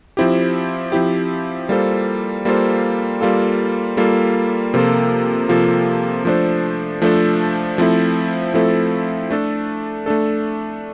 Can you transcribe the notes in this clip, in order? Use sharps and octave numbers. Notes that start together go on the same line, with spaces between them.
F3 C4 E4 G4
F3 C4 E4 G4
G3 A#3 F4 A4 C5
G3 A#3 F4 A4 C5
G3 A#3 F4 A4
G3 A#3 F4 A4
C3 F3 A#3 F4 A4
C3 F3 A#3 F4 A4
F3 A3 D4 A4 C5
F3 A3 D4 A4 C5
F3 A3 C4 E4 A4
F3 A3 C4 E4 A4
A3 D4 A4
A3 D4 A4